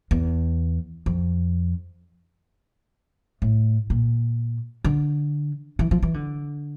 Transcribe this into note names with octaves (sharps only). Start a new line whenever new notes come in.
E2
F2
A2
A#2
D3
E3
F3
E3
D3